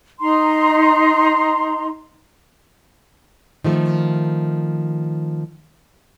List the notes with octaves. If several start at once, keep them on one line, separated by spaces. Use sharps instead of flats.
D#4 A#5 C6
D#3 F3 A3